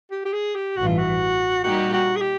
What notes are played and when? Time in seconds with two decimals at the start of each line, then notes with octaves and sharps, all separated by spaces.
0.11 G4
0.25 G4
0.33 G#4
0.55 G4
0.77 A1 G2 E3 F#4
0.87 F4
0.98 F#4
1.64 A#2 G3 A#3 D#4 F#4 G4
1.93 F#4
2.16 G#4
2.21 G4